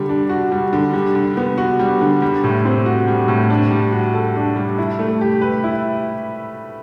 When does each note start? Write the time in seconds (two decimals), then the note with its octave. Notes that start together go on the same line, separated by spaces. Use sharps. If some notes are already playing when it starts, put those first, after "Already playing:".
Already playing: D3 G3
0.09 D4
0.29 F#4
0.52 G3
0.73 D3
0.94 G3
1.15 D3
1.37 B3
1.58 F#4
1.80 G3
2.01 D3
2.22 G3
2.44 A2
2.65 C4
2.86 F#4
3.08 G3
3.28 A2
3.50 D4
3.71 G3
3.93 F#4
4.14 A4
4.36 D4
4.56 G3
4.78 E4
4.99 A3
5.21 G4
5.41 B4
5.64 E4